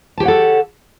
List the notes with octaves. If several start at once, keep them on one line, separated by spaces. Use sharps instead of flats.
G4 A4 C#5 F#5 A5